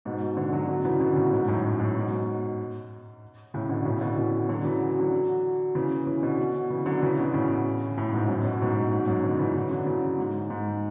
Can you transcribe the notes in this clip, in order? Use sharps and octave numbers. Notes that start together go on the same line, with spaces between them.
G#2 B2
B2 D3
D3 F#3
D3 F#3
C#3 E3
B2 D3
A2 C#3
G#2 B2
F#2 A2
F#2 A2
G#2 B2
A2 C#3
B2 D3
A2 C#3
B2 D3
C#3 E3
D3 F#3
C#3 E3
F#3
D3 F#3
C#3 E3
C#3 E3
B2 D3
C#3 E3
D3 F#3
C#3 E3
B2 D3
A2 C#3
A2 C#3
G#2 B2
G#2
F#2 A2
B2
A2
G#2 B2
G#2 B2
F#2
B2 D3
C#3 E3
C#3 E3
D3 F#3
C#3 E3
G#2
G#2